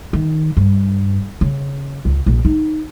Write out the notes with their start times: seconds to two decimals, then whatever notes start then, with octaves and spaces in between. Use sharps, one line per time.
0.13 D#3
0.57 G2
1.41 C#3
2.05 C#2
2.26 A#1
2.45 D#4